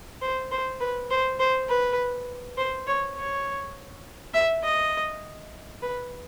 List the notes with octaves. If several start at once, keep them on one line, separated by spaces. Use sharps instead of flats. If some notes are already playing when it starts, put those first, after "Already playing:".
C5
C5
B4
C5
C5
B4
C5
C#5
C#5
E5
D#5
B4